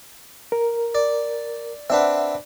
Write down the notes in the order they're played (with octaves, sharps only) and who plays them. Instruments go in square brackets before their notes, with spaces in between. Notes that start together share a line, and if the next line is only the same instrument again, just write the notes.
[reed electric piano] A#4
[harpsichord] D5
[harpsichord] C4 D4 B4 [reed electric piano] E5 F#5